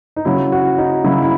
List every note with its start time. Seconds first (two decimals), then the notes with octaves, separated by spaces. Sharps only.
0.16 D#4
0.25 C#3 F#3 E4
0.52 F#4
0.78 D#4
1.04 C#3 F#3 E4
1.22 E4